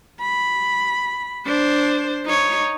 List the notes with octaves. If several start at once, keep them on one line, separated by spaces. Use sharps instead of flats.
B5
D4 C5
D#4 C#5